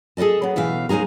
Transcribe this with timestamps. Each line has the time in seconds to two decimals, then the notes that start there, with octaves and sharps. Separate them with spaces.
0.17 G#4 A4 B4 D#5 A5
0.42 F#3 B3
0.56 B2 E3 E5 F5
0.89 D#2 G#3 D#4 G#4 A#5